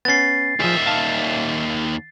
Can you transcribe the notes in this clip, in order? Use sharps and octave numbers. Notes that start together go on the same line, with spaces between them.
B3 C#4 A6 C7
D#2 F3 G#4 E5
F5 A5